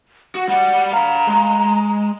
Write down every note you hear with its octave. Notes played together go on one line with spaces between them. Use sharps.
F#4 F#5
G3 D5 F#5
F5 A#5 B5
G#3